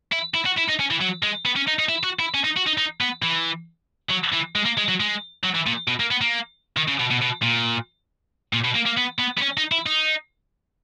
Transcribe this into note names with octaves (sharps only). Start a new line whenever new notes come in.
E4
E4
F#4
E4
D#4
C#4
E3
F#3
G#3
B3
C#4
D#4
D#4
E4
F#4
E4
C#4
D#4
F#4
D#4
D#4
B3
E3
F#3
E3
G#3
A#3
G#3
F#3
G#3
F#3
E3
A#2
B2
A#3
B3
A#3
D#3
C#3
B2
B2
B2
A#2
A#2
B2
A#3
A#3
B3
B3
B3
C#4
D#4
E4
D#4